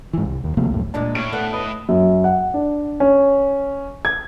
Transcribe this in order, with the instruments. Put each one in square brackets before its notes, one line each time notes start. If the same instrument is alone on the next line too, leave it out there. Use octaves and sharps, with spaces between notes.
[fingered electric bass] G#2 E3
C2
D#2
C3 F3 A3 A#3
C#2 F#2 A2
[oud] E2 A#2 G#3 [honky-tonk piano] D4
[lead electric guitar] A2 [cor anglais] C#4 [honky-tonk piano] D7
[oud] B3 D4 A4 [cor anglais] F#5
[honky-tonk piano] B4 [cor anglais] D#5
[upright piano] F#2
F#5
D4
C#4
G#6